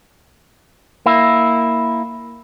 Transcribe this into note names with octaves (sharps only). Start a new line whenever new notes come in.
A#3 E4